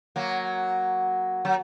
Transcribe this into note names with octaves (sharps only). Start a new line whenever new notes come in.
F#3 A#3
F#3